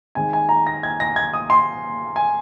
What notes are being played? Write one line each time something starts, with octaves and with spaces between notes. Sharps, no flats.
D#3 G#3 C4 G#5
G#5
A#5
A#6
G#6
A#6
G#6
D#6
C6
G#5